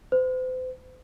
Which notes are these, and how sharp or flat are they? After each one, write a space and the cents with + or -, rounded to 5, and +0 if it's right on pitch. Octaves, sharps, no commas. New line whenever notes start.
C5 -40